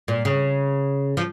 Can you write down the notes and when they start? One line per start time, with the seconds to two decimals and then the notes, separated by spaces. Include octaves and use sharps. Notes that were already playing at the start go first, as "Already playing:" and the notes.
0.08 A#2
0.25 C#3
1.17 F3